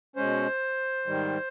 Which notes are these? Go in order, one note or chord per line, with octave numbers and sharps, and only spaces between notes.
B2 G#3 C#4 C5
G#2 D#3 G3